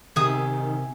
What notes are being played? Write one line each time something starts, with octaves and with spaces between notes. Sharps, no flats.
C3 D#3 G4 G#4 E5 D#6